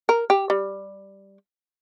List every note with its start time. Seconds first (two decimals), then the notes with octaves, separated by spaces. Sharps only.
0.09 A#4
0.30 G4
0.50 G3